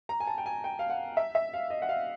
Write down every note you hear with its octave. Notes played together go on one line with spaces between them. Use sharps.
A#5
G#5
A5
G5
G#5
G5
F5
F#5
E5
E5
F5
D#5
F#5
F5